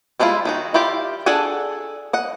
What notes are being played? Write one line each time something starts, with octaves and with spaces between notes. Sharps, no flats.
G3 G#3 D4 E4 F4
D#3 D#4 F#4
E4 F4 G4 D5
D4 G#4 A4 F#5 G#5
D#5 F#5